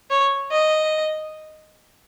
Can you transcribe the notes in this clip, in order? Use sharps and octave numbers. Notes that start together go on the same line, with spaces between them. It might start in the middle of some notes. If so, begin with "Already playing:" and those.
C#5
D#5